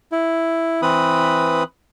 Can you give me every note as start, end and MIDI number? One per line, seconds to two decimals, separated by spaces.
0.12 0.81 64
0.82 1.63 52
0.82 1.63 60
0.82 1.63 71
0.82 1.63 83
0.82 1.63 87